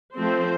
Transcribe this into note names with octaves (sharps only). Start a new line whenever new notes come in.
F3 A3 C4 C5